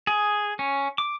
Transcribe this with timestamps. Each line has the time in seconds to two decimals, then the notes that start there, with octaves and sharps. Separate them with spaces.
0.07 G#4
0.59 C#4
0.98 D6